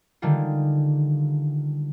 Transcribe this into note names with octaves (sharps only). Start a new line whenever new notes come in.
D3 D#3 G3 G#3 F4